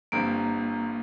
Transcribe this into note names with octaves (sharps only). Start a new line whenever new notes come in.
G1 G2 G3 A#3 C4